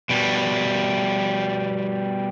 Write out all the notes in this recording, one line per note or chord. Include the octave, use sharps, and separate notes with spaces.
B2 G3